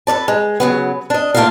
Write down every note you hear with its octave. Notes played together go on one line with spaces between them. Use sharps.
A4 B4 D5 A5
G#3
C#3 F#3 B3
D4 D#5
A3 A#3 F4 A4 A#4 F5